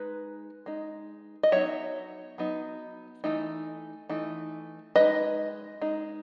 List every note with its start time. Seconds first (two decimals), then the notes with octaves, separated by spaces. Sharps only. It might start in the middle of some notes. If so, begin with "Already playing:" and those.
Already playing: G#3 D#4 B4
0.66 G#3 D#4
1.43 D#5
1.52 F#3 B3 D#4 C#5 E5
2.38 F#3 B3 D#4
3.24 E3 A3 D#4
4.09 E3 A3 D#4
4.96 G#3 D#4 B4 D#5
5.81 G#3 D#4